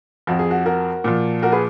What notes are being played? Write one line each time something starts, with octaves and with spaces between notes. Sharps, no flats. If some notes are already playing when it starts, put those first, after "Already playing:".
F2 F3 F#4
G#4
F#4
F#4 A#4
A#2 F3
F#4 A#4
G#4 B4